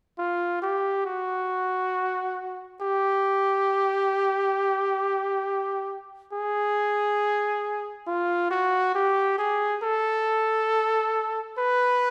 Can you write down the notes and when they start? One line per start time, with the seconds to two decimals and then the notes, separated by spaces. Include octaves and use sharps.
0.19 F4
0.62 G4
1.06 F#4
2.81 G4
6.33 G#4
8.07 F4
8.51 F#4
8.95 G4
9.38 G#4
9.83 A4
11.58 B4